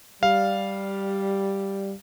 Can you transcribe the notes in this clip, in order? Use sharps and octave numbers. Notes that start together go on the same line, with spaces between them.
G3 F5